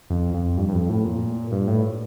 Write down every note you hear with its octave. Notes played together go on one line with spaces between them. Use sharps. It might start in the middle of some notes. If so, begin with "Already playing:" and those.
F2
F2
G2
G2
F2
A2
A#2
G2
A2